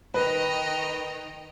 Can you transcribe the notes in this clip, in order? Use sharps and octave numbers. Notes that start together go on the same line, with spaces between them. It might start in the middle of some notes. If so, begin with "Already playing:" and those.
D#3 B4 D#5 G5 A#5